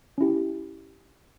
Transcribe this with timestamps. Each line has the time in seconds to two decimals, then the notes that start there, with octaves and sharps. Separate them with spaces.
0.18 C#4 E4 G4